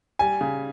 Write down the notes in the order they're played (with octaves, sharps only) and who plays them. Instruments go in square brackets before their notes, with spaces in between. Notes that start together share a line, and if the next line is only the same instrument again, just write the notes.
[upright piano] G3 G#5
C#3